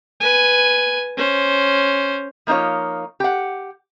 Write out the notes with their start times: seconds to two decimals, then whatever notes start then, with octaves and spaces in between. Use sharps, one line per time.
0.21 B4 G#5
1.17 C#4 C5
2.47 F3 A#3 D#4 F4 C#5
3.20 G4 F#5